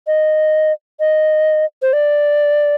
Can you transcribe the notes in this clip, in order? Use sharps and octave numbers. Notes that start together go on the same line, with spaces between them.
D#5
D#5
C5
D5